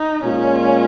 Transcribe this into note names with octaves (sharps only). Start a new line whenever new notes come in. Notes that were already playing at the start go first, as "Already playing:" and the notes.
Already playing: D#4
A#2 G#3 C#4 F4